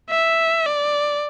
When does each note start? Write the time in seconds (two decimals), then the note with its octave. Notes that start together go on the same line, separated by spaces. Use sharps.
0.10 E5
0.67 D5